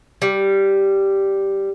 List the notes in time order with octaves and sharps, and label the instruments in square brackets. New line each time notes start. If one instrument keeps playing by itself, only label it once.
[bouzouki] G3